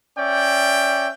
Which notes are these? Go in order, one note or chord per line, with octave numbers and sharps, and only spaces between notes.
C#4 D5 E5 G5